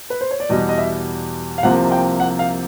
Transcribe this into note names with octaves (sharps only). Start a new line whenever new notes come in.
B4
C5
C#5
D5
E2 B2 G3 B3 D#5
D#5
E5
F5
C2 C3 F3 A#3 F#5
G5
F#5
F5